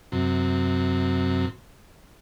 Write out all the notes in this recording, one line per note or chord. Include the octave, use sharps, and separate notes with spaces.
F#2 C3